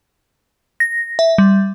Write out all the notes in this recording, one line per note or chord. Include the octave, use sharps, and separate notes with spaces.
A#6
E5
G3